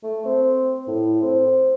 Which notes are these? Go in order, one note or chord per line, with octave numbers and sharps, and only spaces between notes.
A3
C4
A2
C4